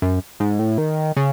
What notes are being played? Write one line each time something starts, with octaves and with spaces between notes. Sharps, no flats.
F#2
G#2
A2
D#3
C#3